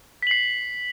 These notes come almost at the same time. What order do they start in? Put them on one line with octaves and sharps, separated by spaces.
B6 F#7 C7